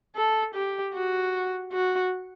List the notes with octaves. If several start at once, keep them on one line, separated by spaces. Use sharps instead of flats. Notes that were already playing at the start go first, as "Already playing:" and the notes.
A4
G4
F#4
F#4